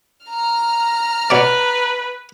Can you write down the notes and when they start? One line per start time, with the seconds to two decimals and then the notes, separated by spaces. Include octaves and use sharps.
0.26 A#5 F6
1.30 B2 B4 C#5 D5